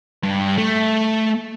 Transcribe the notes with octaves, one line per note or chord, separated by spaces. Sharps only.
G2
A3